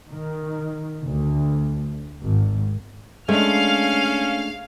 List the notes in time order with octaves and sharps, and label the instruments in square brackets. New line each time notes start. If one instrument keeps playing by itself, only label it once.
[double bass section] D#3
D2
G#1
[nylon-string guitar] G#3 [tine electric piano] A3 D4 [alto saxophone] C#4 [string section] F5 F6